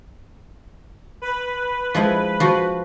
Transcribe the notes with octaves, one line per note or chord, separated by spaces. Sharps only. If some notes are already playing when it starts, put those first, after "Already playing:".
B4
F3 G#3 E4
F3 F#4